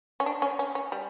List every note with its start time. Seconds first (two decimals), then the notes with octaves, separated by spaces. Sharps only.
0.20 C#4
0.26 D4
0.42 C#4
0.59 C#4
0.75 C#4
0.92 G3